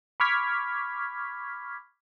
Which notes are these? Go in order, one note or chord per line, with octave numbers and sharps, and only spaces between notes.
B5 C#6 D6 F6 G#6 B6